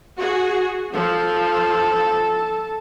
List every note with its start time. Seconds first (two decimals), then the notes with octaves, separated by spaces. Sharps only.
0.18 F#4 G#4
0.94 F3 A4